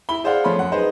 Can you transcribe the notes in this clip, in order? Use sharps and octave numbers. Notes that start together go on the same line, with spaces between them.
E4 B5 G7
G#4 C5 D5 F5 F#5
F3 A3 C#5 B5 C6
F#2 F#5
D#4 G#4 B4 C5